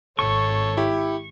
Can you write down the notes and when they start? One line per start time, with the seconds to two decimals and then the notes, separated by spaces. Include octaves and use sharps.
0.19 G#1 G#2 A4 C#5 C#6
0.77 E4 G4